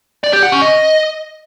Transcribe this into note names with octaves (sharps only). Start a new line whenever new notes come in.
D5
G4
F#5
C#4
D#5